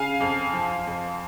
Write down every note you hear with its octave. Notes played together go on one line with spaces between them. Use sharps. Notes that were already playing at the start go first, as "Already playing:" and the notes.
Already playing: C#3 F5 G#5
F2
F3
F2